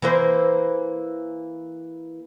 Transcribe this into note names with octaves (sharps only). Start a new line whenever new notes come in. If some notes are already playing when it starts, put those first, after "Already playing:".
E3 A#3 C5